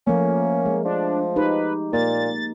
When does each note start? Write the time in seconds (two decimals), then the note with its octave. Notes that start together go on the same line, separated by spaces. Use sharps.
0.07 F3 A3 A#3 C#4
0.66 G#3
0.85 F3 D4
1.36 D#4 G4 B4
1.93 A#2 A#3 A6